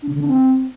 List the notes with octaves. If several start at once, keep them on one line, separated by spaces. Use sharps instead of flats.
D4
C#3
D3
D4
C4